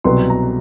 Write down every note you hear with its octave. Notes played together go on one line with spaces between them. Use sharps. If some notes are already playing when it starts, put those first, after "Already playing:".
C2 B2 F#3 B3 C6
A#5